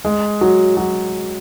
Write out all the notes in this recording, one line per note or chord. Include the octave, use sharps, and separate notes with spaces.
G#3
F#3
F#3